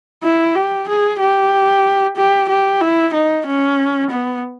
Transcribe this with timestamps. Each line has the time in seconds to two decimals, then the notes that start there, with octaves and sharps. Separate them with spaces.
0.23 E4
0.55 G4
0.88 G#4
1.19 G4
2.17 G4
2.49 G4
2.81 E4
3.13 D#4
3.46 C#4
4.11 B3